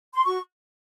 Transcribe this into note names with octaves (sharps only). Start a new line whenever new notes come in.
C6
F#4 C#6